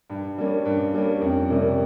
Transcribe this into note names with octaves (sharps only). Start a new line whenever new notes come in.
G2
G3 A#3 C#4
G2
G3 A#3 C#4
F2
C3 G3 A#3 C#4